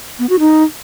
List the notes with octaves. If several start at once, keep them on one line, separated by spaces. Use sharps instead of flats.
B3
F#4
D#4